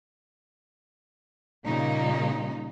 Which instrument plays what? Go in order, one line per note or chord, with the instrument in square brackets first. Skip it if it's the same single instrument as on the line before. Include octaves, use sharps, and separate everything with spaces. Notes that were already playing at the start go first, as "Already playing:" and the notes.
[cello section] A#2 C#3 G3 A#3 D#4